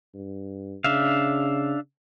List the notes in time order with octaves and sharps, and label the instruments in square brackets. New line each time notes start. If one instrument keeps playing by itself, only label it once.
[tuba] G2
[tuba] C#3 [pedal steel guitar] D4 E5 F5